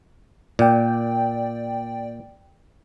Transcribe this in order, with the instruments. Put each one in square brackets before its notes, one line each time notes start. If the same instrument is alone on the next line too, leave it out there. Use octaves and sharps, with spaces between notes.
[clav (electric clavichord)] A#2 [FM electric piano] D5 G5